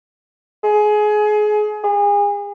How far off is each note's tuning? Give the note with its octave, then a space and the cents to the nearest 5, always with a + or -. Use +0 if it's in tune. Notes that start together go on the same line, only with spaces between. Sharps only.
G#4 +25
G#4 -35